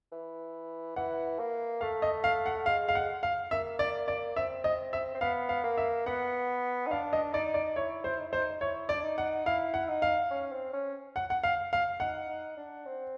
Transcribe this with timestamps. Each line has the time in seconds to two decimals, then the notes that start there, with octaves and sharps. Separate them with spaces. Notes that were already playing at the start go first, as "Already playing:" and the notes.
0.12 E3
0.96 E3 F#5
1.39 A#3
1.81 A3 F5
2.02 D#5
2.24 F5
2.46 F#5
2.66 G#3 F5
2.89 F5
2.95 F#5
3.23 F5
3.51 A#3 E5
3.79 D5
4.08 D5
4.36 C4 E5
4.64 D#5
4.93 E5
5.14 C4
5.21 B3 F5
5.49 F5
5.64 A#3
5.77 E5
6.06 B3 F#5
6.87 D#4
6.91 D4 F5
7.13 D#5
7.33 D#4 D5
7.54 D5
7.76 E4 C#5
8.04 C5
8.18 D#4
8.26 E4
8.32 D#4 C5
8.61 E4 C#5
8.89 D5
8.93 D4
9.03 D#4
9.18 F#5
9.46 E4 F5
9.74 F#5
9.88 D#4
10.02 F5
10.31 C#4
10.52 C4
10.73 C#4
11.16 F#5
11.30 F#5
11.43 F5
11.73 F5
12.00 D#4 F#5
12.29 D#4
12.57 D4
12.85 C4